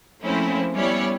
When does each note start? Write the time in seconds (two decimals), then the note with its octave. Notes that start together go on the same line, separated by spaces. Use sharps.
0.22 F3 A3 A#3 C4 C#4 E4
0.75 G3 B3 C#4 E4 C#5 D5